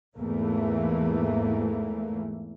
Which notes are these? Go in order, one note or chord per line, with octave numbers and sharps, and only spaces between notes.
E2 G#2 E3 A3 A#3